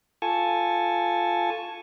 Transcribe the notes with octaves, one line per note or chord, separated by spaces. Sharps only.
F4 A4 G#5 A5 C#6